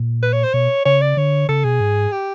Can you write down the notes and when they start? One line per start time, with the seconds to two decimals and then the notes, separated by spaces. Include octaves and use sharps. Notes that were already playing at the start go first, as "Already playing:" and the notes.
Already playing: A#2
0.23 B4
0.33 C#5
0.43 C5
0.54 B2 C#5
0.85 C#3 C#5
1.01 D5
1.17 D3 C#5
1.49 C#3 A4
1.64 B2 G#4
1.80 G#2
2.12 G4